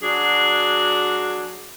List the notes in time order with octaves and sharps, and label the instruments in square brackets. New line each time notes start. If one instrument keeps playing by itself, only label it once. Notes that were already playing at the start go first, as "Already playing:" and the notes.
[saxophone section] F#3 D4 F#4 G#4